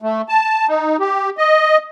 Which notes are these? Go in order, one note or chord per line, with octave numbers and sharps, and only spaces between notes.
A3
A5
D#4
G4
D#5